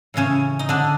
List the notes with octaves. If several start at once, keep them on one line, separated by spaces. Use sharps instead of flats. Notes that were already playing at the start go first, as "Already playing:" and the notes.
A2 C#3 E3 C#4
D#4
D3 D4